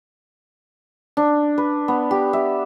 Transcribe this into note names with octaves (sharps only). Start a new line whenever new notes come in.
D4
B4
B3
G4
E5